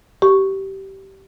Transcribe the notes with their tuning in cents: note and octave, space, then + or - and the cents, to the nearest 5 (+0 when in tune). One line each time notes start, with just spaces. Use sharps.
G4 -20 C#6 +0